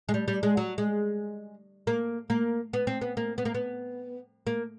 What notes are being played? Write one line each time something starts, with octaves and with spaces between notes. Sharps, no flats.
G#3
G3
G3
G#3
F#3
G#3
A#3
A#3
B3
C4
B3
A#3
B3
A#3
B3
A#3